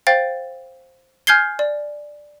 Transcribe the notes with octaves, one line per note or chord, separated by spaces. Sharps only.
C5 F5 G5 A6
G#5 F6 G6 G#6 C7 G7
D5